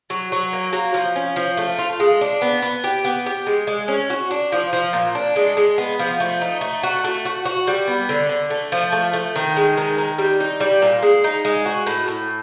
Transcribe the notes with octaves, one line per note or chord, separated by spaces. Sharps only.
F#3
F#3
A#3
F#3
F3
C#4
F3
A3
F4
G#3
D4
B3
B3
G4
B3
G4
G#3
G#3
C#4
F#4
D4
F3
F3
A#2
D4
G#3
G#3
B3
F3
A3
D#4
A3
F#4
A3
F#4
F#4
G3
B3
D3
D3
A3
F3
A3
A3
D#3
G#3
D#3
D#3
G3
D#4
G3
A#2
G#3
D#4
G#3
F#4
A2
A2